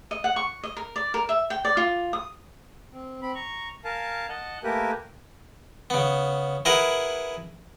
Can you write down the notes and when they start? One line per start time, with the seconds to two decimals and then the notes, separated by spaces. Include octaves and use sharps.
0.11 D#5
0.24 F#5
0.36 C#6
0.63 D#5
0.77 A#4
0.96 D5
1.14 A#4
1.29 E5
1.50 G5
1.65 D5
1.77 F4
2.13 D#6
2.93 C4
3.22 C4 B5
3.35 A#5 C#6
3.85 A#4 F5 G#5 A5
4.29 D#5 F#5 A5
4.63 A3 A#3 G4 A#4 B4 G#5
5.90 C#3 B3
6.65 E4 G#4 A#4 B4 F#5